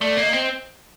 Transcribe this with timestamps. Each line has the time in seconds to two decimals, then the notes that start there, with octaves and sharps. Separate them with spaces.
0.01 A3 D5
0.17 A#3
0.22 D#5
0.33 C4